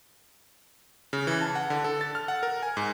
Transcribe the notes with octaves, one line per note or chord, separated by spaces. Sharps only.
C#3
E3
A5
F#5
D3
A4
A6
F6
F#5
A#4
G#5
G#2